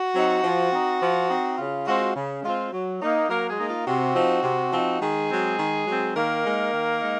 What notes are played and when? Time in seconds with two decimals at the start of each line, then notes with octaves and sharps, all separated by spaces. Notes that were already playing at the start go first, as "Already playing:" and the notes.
Already playing: F#4
0.15 F#3 C4 D#4
0.44 F3
0.72 C4 D#4
1.01 F3
1.29 C4 D#4
1.58 C#3 F4
1.87 G#3 C4 F4 F#4
2.16 C#3
2.43 G#3 C4 F4
2.72 F#3
3.01 A#3 D#4
3.29 F#3 A#3 A#4
3.48 G#3 G#4
3.59 A#3 D#4
3.67 F4
3.86 C3 F#4
4.15 F3 C4 D#4
4.43 C3
4.72 F3 C4 D#4
5.01 D#3 G#3 G#4
5.29 F#3 C4
5.58 D#3
5.87 F#3 C4
6.15 D#3 A#3 A#4
6.44 G#3 D#4
6.73 D#3
7.01 G#3 D#4